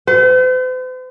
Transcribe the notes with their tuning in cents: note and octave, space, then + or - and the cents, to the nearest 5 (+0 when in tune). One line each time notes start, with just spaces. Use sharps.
C5 -45